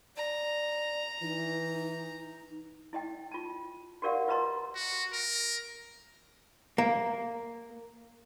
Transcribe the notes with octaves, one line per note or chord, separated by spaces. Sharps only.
D5 A#5
E3 D#4
E4 D#5 G5
F4 A5
F#4 G4 A#4 D5 F5 F#5
F4 B4 D#5 A#5 C6
F#4
A#4
A#3